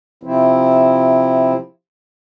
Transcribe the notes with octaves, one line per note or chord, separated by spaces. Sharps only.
C3 F3 C4 E4